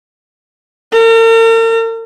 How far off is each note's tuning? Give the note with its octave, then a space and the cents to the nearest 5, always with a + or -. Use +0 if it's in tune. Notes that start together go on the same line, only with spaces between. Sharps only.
A#4 -45